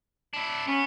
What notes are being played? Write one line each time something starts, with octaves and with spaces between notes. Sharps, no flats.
D4 E4
B3 C#4